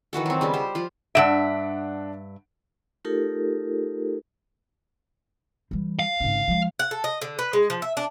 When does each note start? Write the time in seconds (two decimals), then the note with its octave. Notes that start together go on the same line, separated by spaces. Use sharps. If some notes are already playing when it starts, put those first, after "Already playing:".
0.13 D#3 E3 F#4 A4
0.26 F#3 C4
0.41 C#3 G3 B3
0.54 G4 C5
0.75 F3 F4
1.15 G2 E3 D4 E5 F#5 D7
3.05 A3 D#4 F4 G4 A4 A#4
5.71 E3 G3
5.99 F5
6.20 G#1 C#3
6.48 F3 G#3
6.79 F#5
6.91 A4
7.04 D#5
7.22 D3
7.39 B4
7.53 G#3
7.70 F3
7.82 E5
7.97 D4